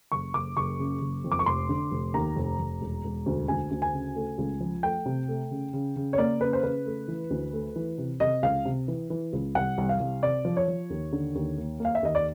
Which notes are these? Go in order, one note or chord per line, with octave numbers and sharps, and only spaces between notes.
F#1 C#6
F#1 D6
F#1 C#6
C#3
F#1
F2
D6
C#6
F1 C6
D3
F1
D#2 A#5
F1
F1
E1
E1
D2
D2 G#5
D2
G#5
C#3
A3
C#2
F3
A3 G5
C3
A3
C#3
C#3
C#3
C#5
A#3 D5
C#3 B4
C5
C#3 B4
A3
E3
D2
A3
E3
C3
C3 D#5
C#2 F5
C3
E3
E3
C#2
C2 F#5
C2
F5
C2
C3 D5
F3
C#5
F3
D#2
D3
D#2
A#3
A#3 F5
E5
D#2 D#5
D5